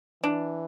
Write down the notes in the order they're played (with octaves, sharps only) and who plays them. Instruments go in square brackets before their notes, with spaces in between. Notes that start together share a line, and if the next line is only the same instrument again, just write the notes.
[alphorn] E3 [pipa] D4